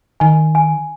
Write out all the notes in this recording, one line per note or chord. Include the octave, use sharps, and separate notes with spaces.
D#3 G#5
G#5